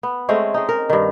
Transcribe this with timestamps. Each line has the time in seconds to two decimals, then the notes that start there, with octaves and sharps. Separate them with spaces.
0.03 B3
0.29 G#3 A3 C4 C#4
0.54 G#3 D#4
0.69 A#4
0.90 G2 D#3